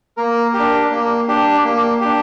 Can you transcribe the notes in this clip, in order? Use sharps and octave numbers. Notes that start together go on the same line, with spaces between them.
A#3 A#4
G4
D4
A#3
D4 G4
A#3
D4 G4